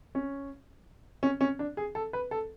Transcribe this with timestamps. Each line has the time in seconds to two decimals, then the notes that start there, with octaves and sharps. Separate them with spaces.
0.15 C#4
1.23 C#4
1.41 C#4
1.59 D4
1.77 G#4
1.95 A4
2.13 B4
2.31 A4